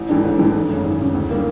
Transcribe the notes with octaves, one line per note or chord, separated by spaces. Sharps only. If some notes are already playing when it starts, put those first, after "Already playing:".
Already playing: A1
G#2 E3 A3 D4
A1
G#2 E3 A3 D4
G#1
F#2 C#3
G#1
F#2 C#3
D2
D3 G3 A#3